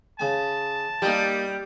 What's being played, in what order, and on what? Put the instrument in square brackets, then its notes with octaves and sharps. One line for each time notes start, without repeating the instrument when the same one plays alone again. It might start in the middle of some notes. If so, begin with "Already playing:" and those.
[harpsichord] C#3 G#5 [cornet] A5
[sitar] G3 [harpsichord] A#3 D#4 G4